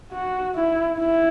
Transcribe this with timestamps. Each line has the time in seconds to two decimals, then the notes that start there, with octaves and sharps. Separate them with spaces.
0.12 F#4
0.55 E4
0.98 E4